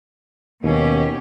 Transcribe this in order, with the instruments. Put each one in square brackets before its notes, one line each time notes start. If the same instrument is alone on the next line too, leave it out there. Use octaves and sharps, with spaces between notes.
[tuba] D#2 [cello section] B2 C#4 G4